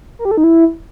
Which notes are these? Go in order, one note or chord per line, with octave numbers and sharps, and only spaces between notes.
A#4
G4
A4
D#4
E4